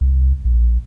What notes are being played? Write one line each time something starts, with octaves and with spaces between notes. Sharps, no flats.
C2
A#1